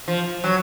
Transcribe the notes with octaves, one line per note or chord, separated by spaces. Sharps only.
F3
F#3